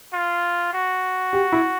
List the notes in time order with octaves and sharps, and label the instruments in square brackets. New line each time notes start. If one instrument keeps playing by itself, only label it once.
[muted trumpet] F4
F#4
[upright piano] G4
E4